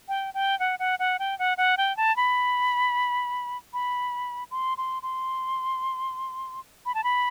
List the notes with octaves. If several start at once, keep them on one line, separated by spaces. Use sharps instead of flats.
G5
G5
F#5
F#5
F#5
G5
F#5
F#5
G5
A5
B5
B5
C6
C6
C6
B5
A5
B5